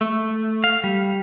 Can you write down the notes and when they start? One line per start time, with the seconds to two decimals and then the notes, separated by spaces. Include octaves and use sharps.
0.01 A3
0.64 F5
0.84 G3